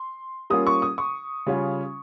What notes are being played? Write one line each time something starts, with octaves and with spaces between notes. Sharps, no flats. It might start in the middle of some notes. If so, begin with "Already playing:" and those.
Already playing: C6
G3 A#3 C#4 F4 D#6
C#6
D#6
C#6
C#3 G3 C#4 F4